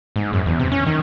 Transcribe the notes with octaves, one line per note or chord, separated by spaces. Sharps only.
G#2
F#2
E2
C3
C#4
D#3